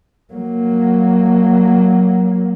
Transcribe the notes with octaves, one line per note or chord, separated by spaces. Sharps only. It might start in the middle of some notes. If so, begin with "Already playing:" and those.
F#3 A#3